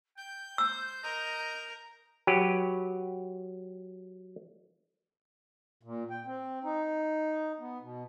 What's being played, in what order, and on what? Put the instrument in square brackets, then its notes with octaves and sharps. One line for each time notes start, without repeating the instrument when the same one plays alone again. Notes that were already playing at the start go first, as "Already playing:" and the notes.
[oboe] G5 [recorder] G6
[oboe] C5 [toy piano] E6
[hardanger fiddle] A#4 [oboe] D#5
[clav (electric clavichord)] F#3 G4 B4
[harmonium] A#2
G5
C4
D#4
B3
B2